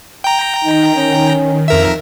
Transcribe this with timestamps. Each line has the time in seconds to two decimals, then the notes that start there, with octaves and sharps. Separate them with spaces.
0.24 G5 A#5
0.64 D#3 D#4
0.96 C#4
1.68 F2 A#4 E5